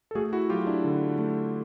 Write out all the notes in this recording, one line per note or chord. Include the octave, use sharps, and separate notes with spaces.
A4
A3 F#4 G#4
E4 F#4
F#3 F4 G4
D4 E4
D3
A3